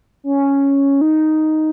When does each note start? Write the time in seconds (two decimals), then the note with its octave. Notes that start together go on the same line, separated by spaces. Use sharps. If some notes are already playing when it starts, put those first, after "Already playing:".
0.24 C#4
1.01 D#4